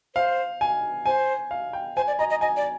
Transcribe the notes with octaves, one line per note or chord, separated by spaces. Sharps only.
C5 F5
G#5
C5 G#5
F5
G5
C5 G#5
D5
D#5 A#5
D#5
D#5 G#5
D5